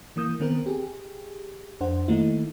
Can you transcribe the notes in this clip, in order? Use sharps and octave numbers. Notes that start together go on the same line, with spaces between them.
E3 A#3 D#6 G6
D#3 B3 C4 A#4
G4 G#4
F2 D4 C5 F#5
D#3 A3 A#3 D#4 E4